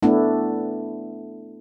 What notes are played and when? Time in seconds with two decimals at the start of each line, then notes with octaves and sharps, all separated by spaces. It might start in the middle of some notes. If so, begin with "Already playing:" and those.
0.03 A3 B3 D4 E4